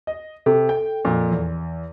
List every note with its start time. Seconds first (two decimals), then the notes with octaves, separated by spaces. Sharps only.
0.07 D#5
0.46 C3 A4
0.69 G5
1.05 F2 A#2
1.32 E2